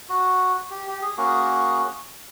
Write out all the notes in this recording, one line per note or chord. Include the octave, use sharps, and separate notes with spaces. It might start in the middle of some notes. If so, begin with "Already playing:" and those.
F#4
G4
G4
G#4
A#3 C#4 F#4